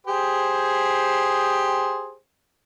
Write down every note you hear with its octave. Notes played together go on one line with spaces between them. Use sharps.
G4 G#4 C5